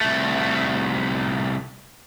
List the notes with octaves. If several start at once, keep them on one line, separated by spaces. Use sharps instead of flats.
C2 A3